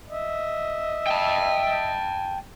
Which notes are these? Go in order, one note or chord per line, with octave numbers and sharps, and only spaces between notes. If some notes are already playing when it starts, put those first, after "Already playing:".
D#5 E5
G5 A5